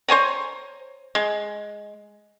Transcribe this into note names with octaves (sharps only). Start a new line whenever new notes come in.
C5 C#5 G#5 A#5
G#3